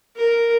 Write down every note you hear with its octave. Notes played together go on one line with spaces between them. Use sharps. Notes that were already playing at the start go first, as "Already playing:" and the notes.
A#4